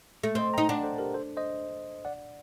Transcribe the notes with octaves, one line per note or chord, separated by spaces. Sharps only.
A3
C4 C5 D#5
G5 A#5
D#4
D4 F#5 A5
A4 C5
G4 A#4
A4 C5
C5 D#5
D5 F#5